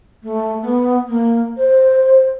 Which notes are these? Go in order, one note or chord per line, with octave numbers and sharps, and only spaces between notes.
A3
B3
A#3
C5